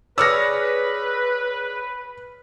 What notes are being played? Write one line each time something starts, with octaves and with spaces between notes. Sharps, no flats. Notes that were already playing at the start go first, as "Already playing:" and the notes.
G#4 B4 C#5 D5 E6 F6 A#6